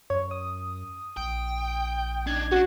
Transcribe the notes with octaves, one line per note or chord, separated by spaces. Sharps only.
F#2 C#5
D#6
A#1 G5
D4 D#4 G#6
C#4 D4 F#4